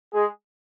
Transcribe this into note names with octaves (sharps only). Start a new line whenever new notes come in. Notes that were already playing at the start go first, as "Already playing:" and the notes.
G#3 G#4